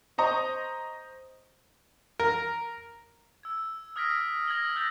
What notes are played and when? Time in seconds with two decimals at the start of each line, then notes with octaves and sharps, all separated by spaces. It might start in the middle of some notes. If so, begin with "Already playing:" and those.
0.18 C5 D#5 A#5 C#6
2.20 A#4
3.43 E6 G#6
3.96 D#6 F6 G#6 A#6 B6 D7
4.47 D#6 G#6 A#6 F#7 G7
4.76 E6 F6 G6 A6 A#6 F7